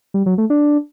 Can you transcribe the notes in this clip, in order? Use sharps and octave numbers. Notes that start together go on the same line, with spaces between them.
G3
F#3
A3
D4